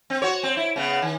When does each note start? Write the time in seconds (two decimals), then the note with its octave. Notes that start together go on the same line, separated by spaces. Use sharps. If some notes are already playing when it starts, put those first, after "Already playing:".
0.10 C4
0.22 F#4 C#5
0.43 C4
0.57 E4
0.76 C#3 B3
1.02 D#3